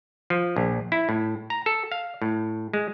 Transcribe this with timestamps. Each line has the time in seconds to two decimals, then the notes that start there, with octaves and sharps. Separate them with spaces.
0.30 F3
0.56 A#1
0.92 E4
1.09 A2
1.50 A#5
1.66 A4
1.92 F5
2.22 A2
2.73 G#3